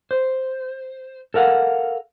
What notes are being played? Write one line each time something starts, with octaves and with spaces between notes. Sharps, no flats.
C5
A4 A#4 F5 F#5